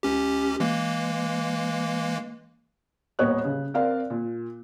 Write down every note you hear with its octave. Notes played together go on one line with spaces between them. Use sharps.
C#2 C#4 G4
E3 G#3 A#3
D#1 D#2 B3 C#5 D#5 F#6
C#3
C4 A#4 D5 F5
A#2